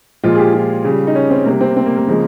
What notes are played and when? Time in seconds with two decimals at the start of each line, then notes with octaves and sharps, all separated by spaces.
0.23 A#2 F3 G#3 F4
0.35 G#4
0.39 G4
0.54 F4
0.84 C#3 G3
1.07 D#4
1.15 C#4
1.31 C4
1.46 C3 G3 A#3
1.61 C4
1.77 C4
1.86 A#3
1.97 A#3
2.07 C#3 F3 G#3